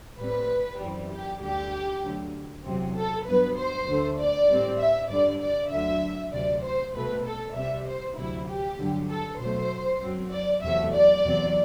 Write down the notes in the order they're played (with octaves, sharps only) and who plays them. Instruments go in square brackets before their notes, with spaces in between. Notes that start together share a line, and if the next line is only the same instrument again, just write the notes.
[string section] A2 G3 C4 B4
F#2 E3 G3 C4
G4
D2 D3 G3 G4
D2 D3 F#3
E2 C3 F#3 C4
A4
G2 F#3 B3 B4
C5
D2 D3 A3
D5
A2 G3 C4
E5
G2 D3 G3 D5
D5
D2 D3 F#3 E5
D2 C3 F#3 D5
C5
C2 B2 A3 C4 B4
A4
C2 C3 G3 E5
C5
D2 C3 F#3 E4
G4
G2 D3 F#3
A4
B2 F#3 A3 C5
F#2 F#3 C4
D5
E2 C3 F#3 A3 E5
D5
E2 C3 F#3 C4